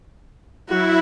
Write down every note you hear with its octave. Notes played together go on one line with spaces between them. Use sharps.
F#3 E4 F#4